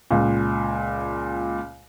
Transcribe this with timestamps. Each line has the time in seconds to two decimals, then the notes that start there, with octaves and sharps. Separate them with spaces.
0.11 C#2 A#2